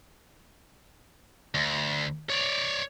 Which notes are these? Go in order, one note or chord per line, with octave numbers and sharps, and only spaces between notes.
D2
C#5 D5